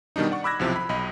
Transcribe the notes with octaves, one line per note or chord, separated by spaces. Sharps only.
B2 D#3 G3 D4 D#4
D5 F#5 C#6
B5 D6 E6 F#6 G#6 A#6
B1 C3 F3 E4 G4
B5
B1 D#5 B5